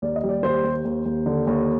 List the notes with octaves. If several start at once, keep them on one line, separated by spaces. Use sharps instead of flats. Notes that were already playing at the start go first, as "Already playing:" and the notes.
D#2 D5
D#5
G3
D5
D#2 C5
D#2
D#2
D#2
D3
D#2